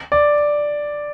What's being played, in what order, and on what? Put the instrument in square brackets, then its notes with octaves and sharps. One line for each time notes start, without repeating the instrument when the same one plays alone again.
[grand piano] D5